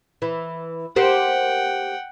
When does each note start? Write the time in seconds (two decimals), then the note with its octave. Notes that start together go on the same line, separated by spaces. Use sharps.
0.22 E3
0.96 G4 A#4 C5 F#5 G5